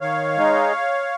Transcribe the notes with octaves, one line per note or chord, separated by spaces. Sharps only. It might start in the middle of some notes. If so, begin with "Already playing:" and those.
D#3 C#5 F5
G#3 D#4